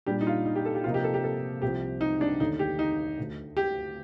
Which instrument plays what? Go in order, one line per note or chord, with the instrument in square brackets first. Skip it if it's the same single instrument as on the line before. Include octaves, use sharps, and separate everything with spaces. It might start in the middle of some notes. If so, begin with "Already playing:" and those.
[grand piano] A#2 G3 D4 [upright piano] G4
[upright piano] D#4
F4
D#4
G4
A4
G4
[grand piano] C3 F3 A#3 D#4 [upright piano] F4
[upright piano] G4
A4
G4
A4
[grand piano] C2 C3 F3 [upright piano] G4
[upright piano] D#4
D4
[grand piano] D#2 D3 A3 D4 [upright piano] D#4
[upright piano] G4
D#4
[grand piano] D2 D3 A3
[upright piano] G4